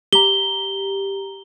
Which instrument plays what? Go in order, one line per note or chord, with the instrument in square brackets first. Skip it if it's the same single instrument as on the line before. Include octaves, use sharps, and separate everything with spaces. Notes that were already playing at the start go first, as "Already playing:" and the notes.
[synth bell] G4 A#5 [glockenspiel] G7